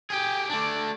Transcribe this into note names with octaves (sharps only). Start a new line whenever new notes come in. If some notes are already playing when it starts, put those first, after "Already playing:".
G4 G#4 G5
A3 D4 D5 D6